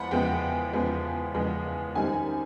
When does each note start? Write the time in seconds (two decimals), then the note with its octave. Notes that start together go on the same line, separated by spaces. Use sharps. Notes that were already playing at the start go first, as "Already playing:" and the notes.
Already playing: E2 F3 G#3 B3 F#5 B5
0.11 E2 C#3 F3 G#3 B3 G5
0.73 E2 C#3 F3 G#3 B3
1.34 E2 C#3 F3 G#3 B3
1.95 F#2 D#3 G3 C4 D#4 G#5